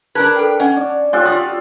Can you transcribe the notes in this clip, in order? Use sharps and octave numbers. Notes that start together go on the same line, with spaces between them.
D4 A#4 B4 A5 F#6 G#6
A4 G5
C#4 D#5 F#5 G#5
D4
F4 G4 A4 C#5 G#5 F#6
F4 F#4 D5 D#6